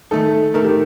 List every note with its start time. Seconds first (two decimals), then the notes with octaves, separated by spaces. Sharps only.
0.11 D#3 A3 D#4 A4
0.54 D#3 A3 D#4 A#4
0.64 G4